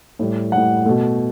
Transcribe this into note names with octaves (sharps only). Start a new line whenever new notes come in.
A2 G3
A2 G3 F#5
B2 A3